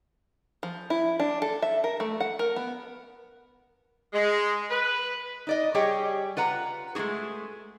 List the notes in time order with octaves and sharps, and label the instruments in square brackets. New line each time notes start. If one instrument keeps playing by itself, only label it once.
[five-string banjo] F3
E4
D4
A4
E5
A#4
A3
F#5
A#4
B3
[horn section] G#3
B4
[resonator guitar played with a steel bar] D#4 D5 D#5
G3 G4 G#4 C#5 D#5 G5
F4 B4 F#5 A#5
G#3 A3 D4 F#4 G#4